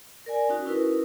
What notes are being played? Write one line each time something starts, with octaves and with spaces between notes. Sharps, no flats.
A#4 D5 G#5
C#4 D#4 F#4
C#4 D#4 E4 A#4 B4